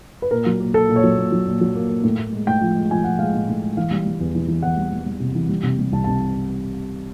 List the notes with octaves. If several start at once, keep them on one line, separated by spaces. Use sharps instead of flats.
B4
A#2 A#4
F#3
A#3
A#3 A4
A#2
C#5
F#3
A#2
F#3
A#2
F#3
A#3
A#3
A2
A2
G#3
A2 G5
F3
G#3
F3 G#5
F3 F#5
G#3 F5
A2
A2
G#3
E3 F5
G3
G3
E2
E3
E3
E2 F#5
G3
G3
G3
C3
E3
G3
C3
G3
C2 A5
C3 A5